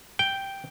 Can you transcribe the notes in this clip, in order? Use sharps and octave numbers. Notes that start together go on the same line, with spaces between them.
G5